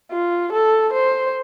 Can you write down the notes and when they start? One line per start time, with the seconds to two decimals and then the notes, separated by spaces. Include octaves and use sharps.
0.11 F4
0.53 A4
0.94 C5